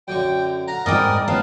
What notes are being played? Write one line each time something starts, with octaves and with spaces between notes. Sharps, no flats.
F#2 D3 G5 C#6
F5 F#5 A#5
G#2 B3 D#4 A#4 D5 G5 D#6
A2 B3 F5 A5